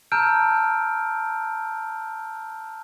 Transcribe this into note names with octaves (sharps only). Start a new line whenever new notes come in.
A5 A#5 E6 F6 G6 D7